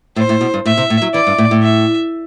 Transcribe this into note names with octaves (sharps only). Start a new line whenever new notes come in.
A2 C5
A2
B2
G2
A2 E5
C3
A2
F#3
E3 D5
G2
A2
A2
E5